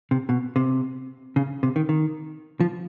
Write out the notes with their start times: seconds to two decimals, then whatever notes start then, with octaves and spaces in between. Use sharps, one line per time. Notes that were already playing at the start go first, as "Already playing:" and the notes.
0.11 C3
0.29 B2
0.56 C3
1.36 C#3
1.63 C3
1.76 D#3
1.89 D#3
2.60 F3